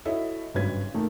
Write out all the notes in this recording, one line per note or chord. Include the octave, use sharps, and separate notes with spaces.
E4 F#4 A4 C#5 D#5 E5
G#1 G2 C#3 F#3 B4 G#6
D#3 A3 A#3